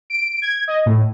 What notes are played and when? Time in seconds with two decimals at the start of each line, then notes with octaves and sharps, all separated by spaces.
0.10 D7
0.42 G#6
0.68 D#5
0.86 A2